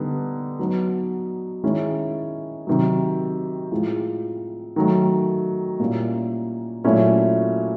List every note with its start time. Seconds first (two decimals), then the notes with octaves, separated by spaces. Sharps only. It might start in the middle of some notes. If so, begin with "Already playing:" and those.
Already playing: D3 G3 B3 D#4
0.59 F#3 B3 D#4
1.64 D#3 G#3 C#4 E4
2.67 C3 D#3 F#3
3.72 A2 F3 G#3
4.76 D#3 F#3 A3
5.79 A#2 G3 A#3 C#4 E4
6.84 A#2 F#3 A3 C#4 E4